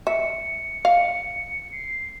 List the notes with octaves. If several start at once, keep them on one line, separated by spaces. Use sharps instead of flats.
E5 C#7
F5
C7